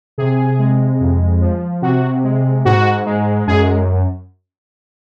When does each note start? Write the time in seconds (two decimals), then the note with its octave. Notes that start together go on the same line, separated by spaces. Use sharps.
0.18 C3 G#4
0.59 G#3
1.00 F2
1.41 F3
1.82 C3 F#4
2.23 G#3
2.65 G#2 F#4
3.06 G#3
3.47 F#2 G#4